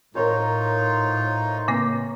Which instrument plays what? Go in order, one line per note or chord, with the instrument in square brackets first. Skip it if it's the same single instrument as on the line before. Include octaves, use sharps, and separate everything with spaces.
[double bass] A2 [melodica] D#4 F4 [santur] A#4 C5 C#5
[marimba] C#3 A#3 C4